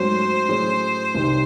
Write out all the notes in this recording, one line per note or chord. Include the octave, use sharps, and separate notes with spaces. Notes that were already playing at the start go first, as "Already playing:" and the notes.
Already playing: G#2 F#3 A3 C#4 F#4 C5
A2 F#3 C#4 G#4
C2 C3 D#3